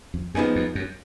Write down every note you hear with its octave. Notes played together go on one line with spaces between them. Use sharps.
F2
F#2 F3 B3 D#4 G#4
F2
F#2